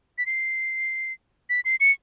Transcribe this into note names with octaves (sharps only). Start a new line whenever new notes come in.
B6
C7
B6
C7
C#7